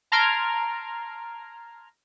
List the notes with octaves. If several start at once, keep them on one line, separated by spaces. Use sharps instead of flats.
A5 A#5 C6 F6 G#6 D7